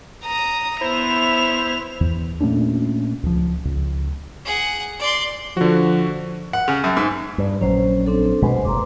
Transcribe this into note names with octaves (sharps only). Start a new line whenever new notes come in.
A#5 D#6
B3 E4 C5 E5 F7
E2
A#2 A3 C#4 D4
C#2 F3
C#2
G#4 F#5
D5 C6
D3 F3 F#4
F#5
C#3
F#2
G#2
G2
A#1 F#3 C#4 C5
C4 D4 A4
C2 B2 G#3 B4 C5
F#1 A#5 C6 D6